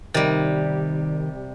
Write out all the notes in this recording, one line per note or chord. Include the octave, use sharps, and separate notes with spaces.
C3 D#3 G3